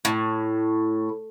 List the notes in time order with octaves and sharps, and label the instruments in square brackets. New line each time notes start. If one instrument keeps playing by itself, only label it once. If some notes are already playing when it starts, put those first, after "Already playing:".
[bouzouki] A2